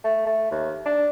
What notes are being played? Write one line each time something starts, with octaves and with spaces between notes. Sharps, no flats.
A3
A3
D#2
D4